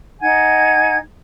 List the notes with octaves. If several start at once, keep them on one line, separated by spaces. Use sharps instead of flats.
D#4 F#5 G#5 G#6